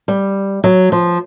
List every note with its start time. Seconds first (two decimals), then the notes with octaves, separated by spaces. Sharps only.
0.08 G3
0.64 F#3
0.92 F3